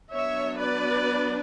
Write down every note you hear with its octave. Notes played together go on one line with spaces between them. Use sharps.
F#3 B3 D4 C#5 E5
B4 D5